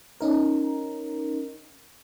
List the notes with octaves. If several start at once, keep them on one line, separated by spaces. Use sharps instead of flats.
C#4 D#4 A#4